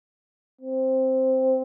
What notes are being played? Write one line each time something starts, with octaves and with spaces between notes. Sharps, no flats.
C4